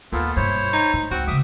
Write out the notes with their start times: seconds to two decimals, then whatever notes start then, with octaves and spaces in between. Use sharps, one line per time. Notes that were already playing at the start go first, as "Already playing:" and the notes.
0.12 D#2 A#2 B3 F4 A4
0.36 G2 B2 E4 C5 C#5
0.73 D#4
0.93 A2
1.11 C#2 C4 F#4 G5
1.27 C#3 C#4 E5 D6 D#6